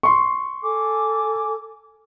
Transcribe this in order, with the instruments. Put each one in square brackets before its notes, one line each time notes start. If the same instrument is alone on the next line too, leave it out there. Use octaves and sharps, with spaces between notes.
[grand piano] C6 C#6
[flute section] A4 G#5 D6